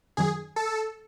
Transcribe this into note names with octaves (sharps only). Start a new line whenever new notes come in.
F#2 D#3 F#3 G#4
A4